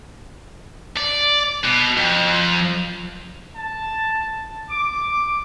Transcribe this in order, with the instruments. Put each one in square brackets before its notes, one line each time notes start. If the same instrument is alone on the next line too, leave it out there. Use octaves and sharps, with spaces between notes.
[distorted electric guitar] D5
B2
F2
[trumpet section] A5
D6